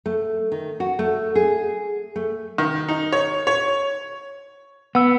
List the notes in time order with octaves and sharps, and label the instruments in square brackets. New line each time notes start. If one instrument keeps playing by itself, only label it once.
[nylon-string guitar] A3
D#3
F#4
A3
G#4
A3
[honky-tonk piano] D#3
D#4
C#5
C#5
[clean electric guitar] B3 [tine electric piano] F#5 E6